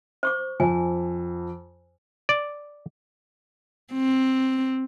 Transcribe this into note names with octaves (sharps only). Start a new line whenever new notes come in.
C5 C#6 D6
F2 G#5
D5
C4